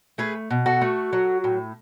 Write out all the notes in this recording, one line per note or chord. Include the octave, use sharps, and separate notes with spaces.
A3 G#4 B4
B2
F#4 A4
A3
F#3
A2